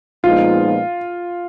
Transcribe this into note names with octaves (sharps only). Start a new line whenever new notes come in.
A#2 F3 G#3 B3 D#4 F4